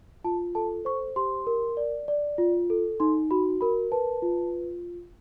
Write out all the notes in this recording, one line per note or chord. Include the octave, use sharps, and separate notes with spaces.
F4 A5
A4 A5
C5 C#6
G4 C6
A#4
D5
D5
F4
A4
D#4 C6
F#4 B5
A#4 B5
B4 A5
F4